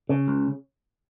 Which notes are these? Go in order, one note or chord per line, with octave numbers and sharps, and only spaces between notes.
C#3
C#2